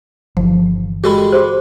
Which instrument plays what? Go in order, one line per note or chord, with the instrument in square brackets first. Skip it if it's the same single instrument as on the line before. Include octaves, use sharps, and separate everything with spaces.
[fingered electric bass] G1 E3 [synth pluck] F3
[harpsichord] G3 G#3 [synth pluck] F#4 A4 B5
[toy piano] G4 G#4 C5